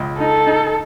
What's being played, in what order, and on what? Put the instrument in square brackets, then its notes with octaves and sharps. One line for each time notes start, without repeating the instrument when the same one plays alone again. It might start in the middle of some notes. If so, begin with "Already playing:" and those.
Already playing: [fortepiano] C#2
[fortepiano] D#4 [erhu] A4
[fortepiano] D#4